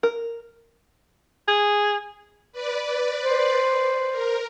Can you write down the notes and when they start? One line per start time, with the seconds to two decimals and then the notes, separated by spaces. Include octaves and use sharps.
0.03 A#4
1.48 G#4
2.52 B4 D5
3.23 C5
4.11 A#4